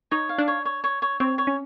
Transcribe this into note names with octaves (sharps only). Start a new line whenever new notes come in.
D#4 C#5
F5
D4
C#5
C#5
C#5
C#5
C4 C#5
C#5
C#4